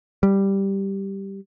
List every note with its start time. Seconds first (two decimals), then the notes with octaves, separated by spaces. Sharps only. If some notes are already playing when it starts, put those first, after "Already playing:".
0.23 G3